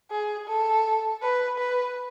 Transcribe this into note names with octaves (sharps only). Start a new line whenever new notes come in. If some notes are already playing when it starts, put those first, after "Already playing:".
G#4
A4
B4
B4